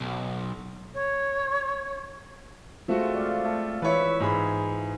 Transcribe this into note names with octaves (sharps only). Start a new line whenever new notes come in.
B1
C#5
G#3 A3 C4 F4 F#4
D5 F5
A3
E3 E4 B4 C#5 E5
G#2 G#4 B5